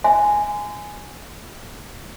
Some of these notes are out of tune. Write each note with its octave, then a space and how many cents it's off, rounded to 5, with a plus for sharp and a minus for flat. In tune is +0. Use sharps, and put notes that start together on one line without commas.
E5 +30 G#5 +0 C6 -30